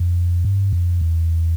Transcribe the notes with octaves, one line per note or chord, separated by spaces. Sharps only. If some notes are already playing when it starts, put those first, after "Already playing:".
Already playing: F2
G2
F2
E2